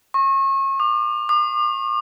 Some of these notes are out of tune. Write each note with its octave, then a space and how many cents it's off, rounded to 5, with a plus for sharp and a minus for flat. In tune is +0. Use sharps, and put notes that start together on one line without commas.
C#6 -35
D6 +40
D6 +45